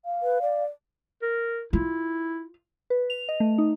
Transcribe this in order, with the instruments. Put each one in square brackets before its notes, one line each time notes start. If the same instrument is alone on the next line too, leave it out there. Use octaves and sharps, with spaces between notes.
[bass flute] F5
[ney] B4
D5
[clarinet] A#4
[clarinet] E4 [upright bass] F4
[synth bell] B4
F7
D#5
A3
D#4